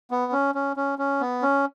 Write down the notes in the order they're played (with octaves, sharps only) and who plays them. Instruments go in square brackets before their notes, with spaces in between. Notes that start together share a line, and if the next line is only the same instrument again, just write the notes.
[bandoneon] B3
C#4
C#4
C#4
C#4
B3
C#4